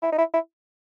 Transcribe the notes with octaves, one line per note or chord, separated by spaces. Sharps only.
E4
D#4
E4
E4